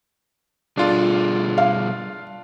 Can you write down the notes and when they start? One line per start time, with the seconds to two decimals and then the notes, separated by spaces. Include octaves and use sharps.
0.77 B2 G3 D4 F4 G#4 A4
1.58 F5